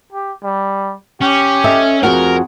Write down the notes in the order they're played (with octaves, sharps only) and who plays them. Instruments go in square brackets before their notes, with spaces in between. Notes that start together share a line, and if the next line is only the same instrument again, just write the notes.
[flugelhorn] G4
G3
[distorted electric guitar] C#4 [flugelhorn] G4
[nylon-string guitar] A4 D#5 E5
[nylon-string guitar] F2 F#4 F#5 [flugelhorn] G#4 [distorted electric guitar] A#4